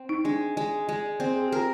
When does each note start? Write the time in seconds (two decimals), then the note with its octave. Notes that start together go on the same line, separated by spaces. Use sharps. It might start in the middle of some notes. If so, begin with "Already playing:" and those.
Already playing: C4
0.09 D#4
0.25 G#3 D4
0.57 G#3
0.89 G#3
1.04 D5
1.20 C4 D5
1.36 G#4
1.48 G4
1.52 F4 A#4